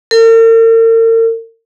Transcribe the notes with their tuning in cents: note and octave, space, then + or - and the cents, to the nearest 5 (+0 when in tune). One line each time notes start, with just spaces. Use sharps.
A#4 -45